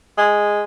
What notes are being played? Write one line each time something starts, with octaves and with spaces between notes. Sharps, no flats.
G#3